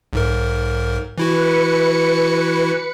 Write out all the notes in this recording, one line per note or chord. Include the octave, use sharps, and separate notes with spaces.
B1 G#2 A#4
E3 E4 F#4 B4 C#7